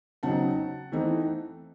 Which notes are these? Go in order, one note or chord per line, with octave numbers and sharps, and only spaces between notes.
C#3 F#3 C4 D#4 F#5 A5
E3 A3 C4 D#4